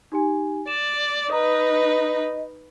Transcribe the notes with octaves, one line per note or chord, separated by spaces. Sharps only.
D#4 G4 G#5
D5 E7
D#4 B4 D#5 A#5 D#6